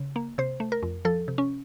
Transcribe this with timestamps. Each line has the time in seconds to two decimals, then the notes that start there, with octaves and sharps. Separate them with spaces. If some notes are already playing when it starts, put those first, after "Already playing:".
Already playing: C#3
0.16 A#3
0.38 C3 C5
0.60 A3
0.72 A#4
0.83 F2
1.05 F3 A4
1.28 C3
1.38 C#4